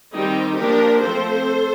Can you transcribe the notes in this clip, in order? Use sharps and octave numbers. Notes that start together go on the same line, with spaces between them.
D#3 G3 C4 D#4 G4
F3 A#3 D4 G4 A#4
F3 A3 C4 A4 C5